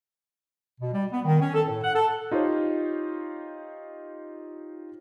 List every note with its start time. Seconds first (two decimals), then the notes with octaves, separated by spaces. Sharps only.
0.81 B2
0.93 G3
1.12 B3
1.25 D#3
1.41 C#4
1.54 A4
1.68 A2
1.84 F#5
1.95 A4
2.31 D#4 F4 G4 C5 C#5